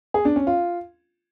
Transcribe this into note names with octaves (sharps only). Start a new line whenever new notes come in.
G#4
D4
C#4
F4